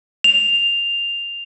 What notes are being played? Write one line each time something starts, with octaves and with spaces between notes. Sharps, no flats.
F7